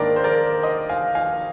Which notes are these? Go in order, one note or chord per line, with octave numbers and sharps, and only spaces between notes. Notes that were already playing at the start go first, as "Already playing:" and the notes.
Already playing: G#2 D#3 A#3 D4 A#4 D5
C5
A#4 D5
C5 D#5
F5 G#5
F5 G#5